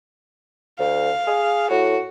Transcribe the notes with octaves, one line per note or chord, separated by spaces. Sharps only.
D2 F5
G#4
A2 F#4